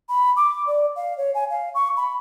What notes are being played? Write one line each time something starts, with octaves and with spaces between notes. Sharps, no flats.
B5
D6
D5
F5
C#5
G#5
F5
C#6
B5